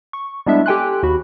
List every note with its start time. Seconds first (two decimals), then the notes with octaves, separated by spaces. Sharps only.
0.13 C#6
0.46 G3 G#3 B3 D4 E4 E5
0.66 G4 A4 G5 G#5 C6 F#6
1.03 D#2 F#4 B5